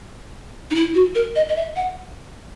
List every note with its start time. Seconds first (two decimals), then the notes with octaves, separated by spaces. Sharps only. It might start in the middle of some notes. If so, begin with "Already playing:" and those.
0.71 D#4
0.75 E4
0.95 F#4
1.15 A#4
1.36 D#5
1.49 D#5
1.56 E5
1.76 F#5